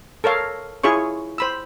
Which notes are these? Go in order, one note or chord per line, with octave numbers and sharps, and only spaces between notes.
A4 A#4 C#5 F5
E4 F4 G#4 C#5 C#6
C5 B5 E6